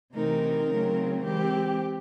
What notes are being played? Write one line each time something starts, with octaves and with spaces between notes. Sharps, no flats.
C3 E3 A3 C4 D#4 A#4
C#3 F#3 A3 C4
E3 G#3 C4 G4